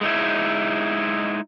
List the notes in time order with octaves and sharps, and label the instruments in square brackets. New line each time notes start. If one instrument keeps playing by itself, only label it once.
[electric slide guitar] G#3 D#4 E4